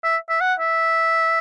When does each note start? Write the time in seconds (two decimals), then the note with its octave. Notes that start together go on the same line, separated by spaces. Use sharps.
0.04 E5
0.29 E5
0.41 F#5
0.60 E5